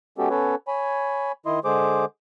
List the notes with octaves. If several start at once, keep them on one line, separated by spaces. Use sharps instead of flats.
G#3 B3 C#4 F#4 G4 A4
B3 C#4 A4 B4 C#5
C#5 G#5 B5
D#3 E4 D#5 C6
D3 G#3 G#4 C5 D6